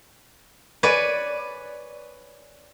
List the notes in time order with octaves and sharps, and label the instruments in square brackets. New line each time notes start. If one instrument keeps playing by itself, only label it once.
[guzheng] B4 C#5 D5 G#5